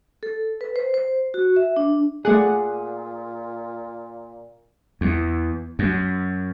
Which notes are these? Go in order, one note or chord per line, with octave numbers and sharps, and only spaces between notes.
A4
B4
C5
C5
F#4
E5
D4
A#2 A3 G#4 D5 F#5
E2
F#2